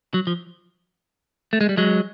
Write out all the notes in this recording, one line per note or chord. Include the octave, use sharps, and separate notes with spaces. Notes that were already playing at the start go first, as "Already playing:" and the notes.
F#3
F3
A3
G#3
G3
F#3 G#3